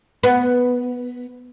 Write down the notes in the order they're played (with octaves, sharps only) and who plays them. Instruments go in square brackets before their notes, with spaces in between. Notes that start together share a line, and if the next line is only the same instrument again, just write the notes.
[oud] B3